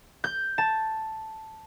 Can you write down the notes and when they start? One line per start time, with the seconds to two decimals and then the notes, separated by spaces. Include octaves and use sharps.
0.24 G6
0.58 A5